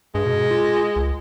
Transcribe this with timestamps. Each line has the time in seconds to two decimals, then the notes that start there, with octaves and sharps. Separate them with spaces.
0.15 G2 G#3
0.26 B2
0.51 F4
0.96 C#2